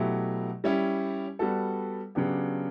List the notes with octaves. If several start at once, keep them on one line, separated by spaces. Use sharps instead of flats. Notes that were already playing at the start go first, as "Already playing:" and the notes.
Already playing: B2 F#3 A3 E4 G4
G3 C#4 E4 G4
G3 B3 F#4 A4
C#3 F#3 B3 D4 G4